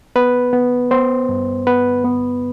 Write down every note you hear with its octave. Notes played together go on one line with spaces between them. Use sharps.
B3 B4
B3
B3 C5
G2
B3 B4
B3